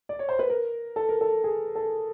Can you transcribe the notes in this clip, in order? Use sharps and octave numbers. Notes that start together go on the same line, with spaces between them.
D5
C#5
C5
B4
A#4
A4
A#4
A4
G#4
A4